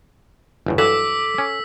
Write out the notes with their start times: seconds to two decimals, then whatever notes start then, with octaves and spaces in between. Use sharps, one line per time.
0.66 G1 E2 A2
0.78 G2 E3 F#3 A4 D6 E6 B6
1.38 C#4